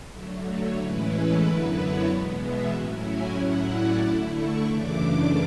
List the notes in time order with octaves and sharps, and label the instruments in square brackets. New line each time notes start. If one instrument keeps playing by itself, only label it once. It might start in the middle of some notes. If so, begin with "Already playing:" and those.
[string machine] D3 F#3 A3 E5
C#5
A2 E3 G#3 C#4 E4 B4
A4
F#2 D3 F#3 B3 E4 B4
C#5
E2 B2 G#3 B3
E5
A2 F#3 C#4 E4 F#5
G#5
A2 F#3 C#4 E4 F#5
D5
D3 A3 E4 D5
C#6
F#2 C#3 E3 A3 D4 D6